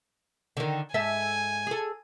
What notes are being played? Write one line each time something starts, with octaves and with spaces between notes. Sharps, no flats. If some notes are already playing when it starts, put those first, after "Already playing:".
D3 D#3
G#2 A4 E5 G#5
G#4 A4